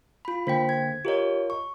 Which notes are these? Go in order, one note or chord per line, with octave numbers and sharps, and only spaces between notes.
F4 B5
D3 A#3 C5 G5 B6
G#6
F4 G4 A#4 C#5 D#5
C#6